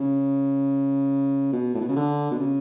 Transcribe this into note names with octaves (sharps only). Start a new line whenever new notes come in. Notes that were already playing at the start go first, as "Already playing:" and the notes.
Already playing: C#3
B2
A2
B2
C#3
D3
B2
C#3